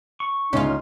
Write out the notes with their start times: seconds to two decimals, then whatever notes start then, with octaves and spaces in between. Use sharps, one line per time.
0.20 C#6
0.53 G1 C#2 C#4 D#4 F4